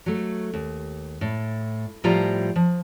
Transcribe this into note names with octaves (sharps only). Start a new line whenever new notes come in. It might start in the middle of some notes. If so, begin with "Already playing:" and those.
F#3 A3
D#2
A2
A2 F3 G3 F4 A#5
F3